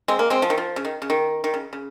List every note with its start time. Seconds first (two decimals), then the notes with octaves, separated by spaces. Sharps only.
0.08 G#3 C4
0.19 A#3
0.30 G#3 C4
0.42 F3
0.50 D#3
0.58 F3
0.76 C#3
0.85 D#3
1.02 C#3
1.10 D#3
1.44 D#3
1.54 C#3
1.73 C#3